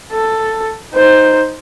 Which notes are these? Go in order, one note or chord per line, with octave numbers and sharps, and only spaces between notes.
A4
D#4 C5